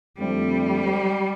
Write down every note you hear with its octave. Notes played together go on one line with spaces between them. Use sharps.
F2 D3 G3 A3 C4